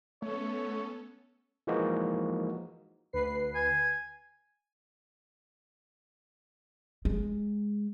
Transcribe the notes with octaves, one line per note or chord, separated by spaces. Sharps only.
A3 B3 C#4 A4 C#5
E3 F3 G#3 A#3 D#4 F#4
D2 B4 C7
G#5
G#3